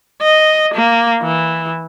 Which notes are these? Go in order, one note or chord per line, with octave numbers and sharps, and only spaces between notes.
D#5
A#3
E3